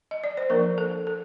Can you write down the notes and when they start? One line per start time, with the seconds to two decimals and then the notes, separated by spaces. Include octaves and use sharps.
0.11 D#5
0.24 D5
0.37 C5
0.50 F3 A#3 D4 A#4
0.78 A4
1.07 A4